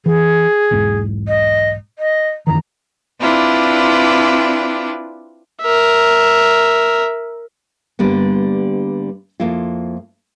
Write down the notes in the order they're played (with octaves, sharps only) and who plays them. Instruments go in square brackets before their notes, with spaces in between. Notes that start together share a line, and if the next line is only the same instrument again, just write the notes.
[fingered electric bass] E3 [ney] G#4
[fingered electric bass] B1 E2 G#2
[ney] D#5
D#5
[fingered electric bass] F#2 D#3 E3 [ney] A#5
[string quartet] C4 D4 E4 F4 B4 D5
[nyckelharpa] A#4 E5
[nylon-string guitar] G2 D3 G3 A#3 B3
F2 A#3 E4 F4